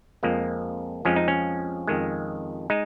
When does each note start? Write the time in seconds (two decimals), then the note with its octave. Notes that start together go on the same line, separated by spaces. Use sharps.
0.23 F2 F3 G#3 A#3
1.05 F2 F3 G#3 C#4
1.16 D#4
1.28 C#4
1.87 F2 D#3 G#3
2.70 G#3 D#4